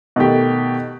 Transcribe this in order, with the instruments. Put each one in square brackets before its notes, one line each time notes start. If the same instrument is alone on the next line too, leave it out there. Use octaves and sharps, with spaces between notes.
[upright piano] B2 D#3 A3 G4